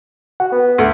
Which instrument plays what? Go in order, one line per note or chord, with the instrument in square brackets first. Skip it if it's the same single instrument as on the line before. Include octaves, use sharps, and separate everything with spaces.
[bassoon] F#4 [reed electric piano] F#5
[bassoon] B3
[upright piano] D2